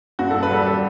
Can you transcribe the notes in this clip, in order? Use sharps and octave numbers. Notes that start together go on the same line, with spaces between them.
G2 F#4
G2 A4
B4
G3 A4
G3 A4